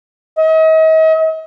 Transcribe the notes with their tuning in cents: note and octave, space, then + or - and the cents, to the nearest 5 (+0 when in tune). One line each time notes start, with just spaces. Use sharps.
D#5 +40